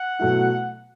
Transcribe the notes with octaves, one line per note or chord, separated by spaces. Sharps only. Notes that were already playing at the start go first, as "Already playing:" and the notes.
Already playing: F#5
B2 F#3 A3 E4